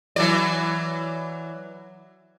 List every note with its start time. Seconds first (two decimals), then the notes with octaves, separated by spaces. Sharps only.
0.16 E3 F#3 D5